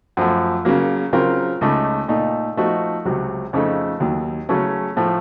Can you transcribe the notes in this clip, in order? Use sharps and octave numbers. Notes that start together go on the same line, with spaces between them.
F#2 F3 A3
C#3 F#3 A#3
C#3 F#3 C4 F4 A#4
C#2 C#3 A3 D#4
A#2 A3 D#4
F3 A3 D#4 F#4
C#2 C3 F#3
F2 C#3 A3 D#4 A4
D#2 D#3 F#3
C#3 F#3 A3 C#4
A2 F3 A3